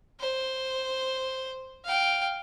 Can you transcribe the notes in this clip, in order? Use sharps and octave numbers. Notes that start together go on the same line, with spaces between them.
C5
F5 G5